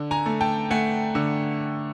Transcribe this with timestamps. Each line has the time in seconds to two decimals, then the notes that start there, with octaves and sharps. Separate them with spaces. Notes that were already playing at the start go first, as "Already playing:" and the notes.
Already playing: D3
0.11 G#5 A#5
0.26 A3
0.41 G5 A5
0.71 A3 F#5 G#5
1.15 D3